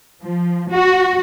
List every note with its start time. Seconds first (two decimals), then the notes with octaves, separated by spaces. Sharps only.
0.21 F3
0.70 F#4